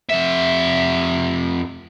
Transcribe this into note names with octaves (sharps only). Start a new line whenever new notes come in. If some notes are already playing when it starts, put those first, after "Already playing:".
F2 E5